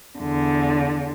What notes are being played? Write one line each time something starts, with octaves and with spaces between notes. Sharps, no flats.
E2 D3